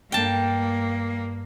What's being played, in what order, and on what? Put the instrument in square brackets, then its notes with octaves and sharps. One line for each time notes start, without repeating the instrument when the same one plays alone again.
[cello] G2 A#3 [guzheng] G5 A5